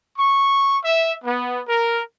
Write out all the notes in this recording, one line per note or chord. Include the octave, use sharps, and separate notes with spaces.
C#6
E5
B3
A#4